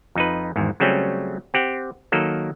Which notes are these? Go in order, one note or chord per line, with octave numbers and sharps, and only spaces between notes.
F2 D#4 B4
G#1 E2 G#2
C#3 F#3 G3 A3 C4 C#4
C4 G4 F#5
D#3 F#3 A#3 A4